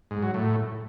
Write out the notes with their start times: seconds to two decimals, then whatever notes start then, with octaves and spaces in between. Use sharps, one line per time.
0.11 G#2
0.23 F#3
0.34 A2